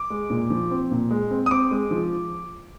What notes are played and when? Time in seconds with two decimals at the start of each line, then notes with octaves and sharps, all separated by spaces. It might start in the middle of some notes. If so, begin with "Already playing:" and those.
Already playing: D6
0.10 G#3
0.30 A#2
0.50 F3
0.71 C4
0.91 A#2
1.11 G#3
1.31 C4
1.46 D#6
1.51 C4 D6
1.71 G#3
1.91 F3